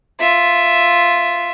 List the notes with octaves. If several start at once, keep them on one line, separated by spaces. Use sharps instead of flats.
F4 E5